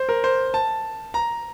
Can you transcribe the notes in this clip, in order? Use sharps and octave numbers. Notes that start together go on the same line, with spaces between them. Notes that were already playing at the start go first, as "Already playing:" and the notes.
Already playing: C5
A#4
C5
A5
A#5